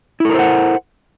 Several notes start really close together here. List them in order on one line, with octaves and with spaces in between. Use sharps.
E4 A4 A#4 C5 F#5